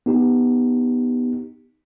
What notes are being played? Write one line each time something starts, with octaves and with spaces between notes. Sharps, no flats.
B3 D#4 G4